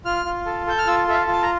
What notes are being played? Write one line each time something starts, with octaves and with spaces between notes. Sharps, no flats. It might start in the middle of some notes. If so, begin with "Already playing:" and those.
F4 F6
F4
A4
A4 G6
F6
F4 E6
A4 E5
F5
F4 A5
A#5